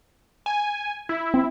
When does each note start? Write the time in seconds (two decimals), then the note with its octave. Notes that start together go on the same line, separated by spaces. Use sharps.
0.46 G#5
1.09 E4
1.34 C4